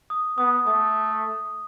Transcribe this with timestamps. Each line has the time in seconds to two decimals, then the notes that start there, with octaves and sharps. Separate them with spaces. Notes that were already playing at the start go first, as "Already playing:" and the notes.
0.10 D#6
0.38 B3 D#6
0.66 A3 D#6